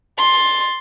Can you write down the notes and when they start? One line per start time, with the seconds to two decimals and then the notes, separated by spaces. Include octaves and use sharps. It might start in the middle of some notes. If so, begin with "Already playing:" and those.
0.19 C6 A6